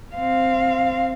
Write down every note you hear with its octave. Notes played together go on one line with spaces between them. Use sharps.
C4 F5